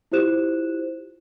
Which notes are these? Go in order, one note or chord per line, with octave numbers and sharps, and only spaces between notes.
E4 F4 G4 C5 F#6 E7